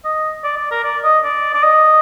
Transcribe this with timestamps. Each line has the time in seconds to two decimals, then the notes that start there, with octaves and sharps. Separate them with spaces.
0.05 D#5
0.44 D5
0.57 D5
0.71 A#4
0.84 D5
1.04 D#5
1.24 D5
1.54 D5
1.63 D#5